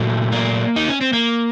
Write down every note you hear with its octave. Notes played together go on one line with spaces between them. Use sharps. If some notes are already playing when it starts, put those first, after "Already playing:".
Already playing: A#2 F#3 A3
A#3
D#4
C#4
C4
A#3